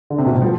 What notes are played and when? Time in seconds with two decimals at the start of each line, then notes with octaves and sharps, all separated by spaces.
0.10 D3
0.18 C3
0.26 B2
0.34 A2
0.42 F3